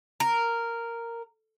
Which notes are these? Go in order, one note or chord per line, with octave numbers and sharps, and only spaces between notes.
A#4